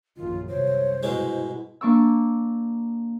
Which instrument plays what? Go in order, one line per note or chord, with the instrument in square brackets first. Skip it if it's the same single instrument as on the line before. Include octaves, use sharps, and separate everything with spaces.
[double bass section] A#1 F#2 D#3 [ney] F4
[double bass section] C2 F#2 [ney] C5 [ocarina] C#5
[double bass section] G2 [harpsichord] B2 G#3 [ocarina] E4
[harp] A#3 D4 C#6 D6 E6